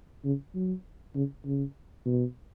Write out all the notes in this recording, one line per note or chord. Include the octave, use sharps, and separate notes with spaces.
C#3
F#3
C#3
C#3
B2